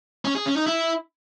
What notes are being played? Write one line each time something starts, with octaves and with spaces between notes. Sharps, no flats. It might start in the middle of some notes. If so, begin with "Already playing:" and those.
C#4
G#4
C#4
D#4
E4